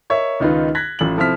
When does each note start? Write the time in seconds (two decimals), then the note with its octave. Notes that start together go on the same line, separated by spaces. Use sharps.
0.10 A#4 C#5 D#5 E5
0.40 C#2 D#3 D#4 F4 B4
0.75 F#6 G#6 A#6 B6
0.99 A1 F4 F#7
1.17 C3 F3 E4 A4 F6 B6